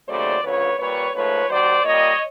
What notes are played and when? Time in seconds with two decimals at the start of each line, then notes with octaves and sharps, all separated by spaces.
0.08 D#2 C#3 F#3 A3 C5 D5
0.44 D2 C#3 F3 B4 C#5
0.79 A#2 G3 B4 C#5
1.15 G#2 F3 A3 B4 C#5
1.50 D#2 D#3 F#3 C5 D5
1.85 A#2 G3 C#5 D#5